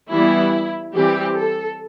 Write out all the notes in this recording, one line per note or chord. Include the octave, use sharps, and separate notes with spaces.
E3 G3 B3 E4
E3 G3 C4 G4
A4